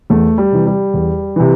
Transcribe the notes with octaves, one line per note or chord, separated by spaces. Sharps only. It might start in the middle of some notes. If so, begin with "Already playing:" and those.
E2 A3
G3
C3 E3
G3
E2
C3 E3